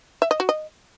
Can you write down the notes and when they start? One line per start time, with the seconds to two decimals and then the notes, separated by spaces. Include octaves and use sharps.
0.22 E5
0.31 D#5
0.40 F#4
0.49 D#5